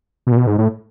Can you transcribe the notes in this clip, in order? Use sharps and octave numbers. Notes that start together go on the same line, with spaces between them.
B2
A#2
B2
G#2
A2